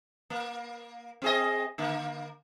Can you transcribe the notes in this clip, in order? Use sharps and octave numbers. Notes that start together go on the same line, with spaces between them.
A#3
C4 G#4 D#5
D3 A#3